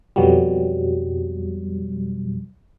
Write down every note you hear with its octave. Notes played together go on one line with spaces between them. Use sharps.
F2 B2 F#3 G3